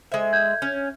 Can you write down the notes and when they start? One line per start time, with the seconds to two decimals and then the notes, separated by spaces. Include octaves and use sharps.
0.12 G#3 C5 E5
0.33 G6 G#6
0.62 C#4